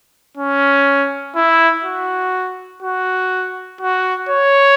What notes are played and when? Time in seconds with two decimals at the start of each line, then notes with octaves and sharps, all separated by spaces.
0.37 C#4
1.36 E4
1.84 F#4
2.83 F#4
3.81 F#4
4.29 C#5